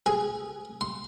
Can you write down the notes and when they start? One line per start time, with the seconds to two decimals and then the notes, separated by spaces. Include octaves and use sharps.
0.06 G#4
0.81 C6